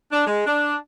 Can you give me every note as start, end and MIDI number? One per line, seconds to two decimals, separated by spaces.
0.12 0.25 62
0.27 0.44 56
0.47 0.76 62